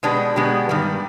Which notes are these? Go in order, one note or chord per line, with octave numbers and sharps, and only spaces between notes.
B2 G#3 B3 D4 G4
B2 G#3 B3 D4 G4
G2 D#3 G3